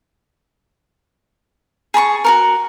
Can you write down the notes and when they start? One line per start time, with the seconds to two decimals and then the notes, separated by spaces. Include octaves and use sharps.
1.94 G#4 A5 B5 C#6
2.24 F#4 A4 A#4